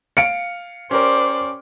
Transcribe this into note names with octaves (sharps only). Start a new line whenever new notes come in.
F5 C#7 D7
C#4 G4 A#4 C5 D5